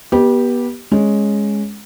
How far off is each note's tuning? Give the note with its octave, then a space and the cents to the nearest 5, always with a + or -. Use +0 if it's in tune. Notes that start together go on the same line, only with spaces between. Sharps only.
B3 -30 G4 +0 D#5 -5
G#3 +0 C#4 +0